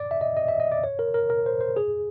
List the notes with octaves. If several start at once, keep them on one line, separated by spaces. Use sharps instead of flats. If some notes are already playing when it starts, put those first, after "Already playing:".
Already playing: D5
E5
D#5
D#5
E5
D#5
D5
C#5
A#4
A#4
A#4
C5
C5
G#4